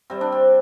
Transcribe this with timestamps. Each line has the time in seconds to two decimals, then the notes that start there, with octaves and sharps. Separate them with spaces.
0.10 C3 G3 C4
0.21 D4
0.32 C4